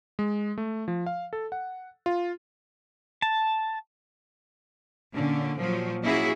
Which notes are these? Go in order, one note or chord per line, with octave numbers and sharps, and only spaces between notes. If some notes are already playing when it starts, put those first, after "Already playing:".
G#3
A3
F3
F5
A4
F#5
F4
A5
A#2 D3 C#4
A#2 F3 F#3
A#3 C#4 E4 F#4 G#4